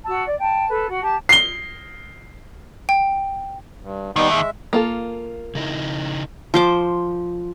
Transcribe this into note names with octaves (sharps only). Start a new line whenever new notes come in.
F#4 A5 E6
D5
G5 A5
A4 B4
F#4
G4 A5
C7 G7
G5
G2
D#2 D#3 G3 B3 D#4
G#3 E5
A#3 F4 A4
C#3 D#4 E4
F3 C5 D6